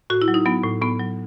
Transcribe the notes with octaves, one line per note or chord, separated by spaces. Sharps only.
A2 F#4
E4
F#3
D#4
F#3 B3
A2
A2 B3
F#3